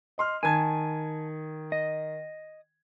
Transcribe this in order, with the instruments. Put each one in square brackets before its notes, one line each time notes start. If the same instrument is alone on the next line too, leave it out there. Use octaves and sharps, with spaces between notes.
[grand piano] D#5 C6 F6
[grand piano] D#3 G#6 [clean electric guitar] G#5 A5
[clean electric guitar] D#5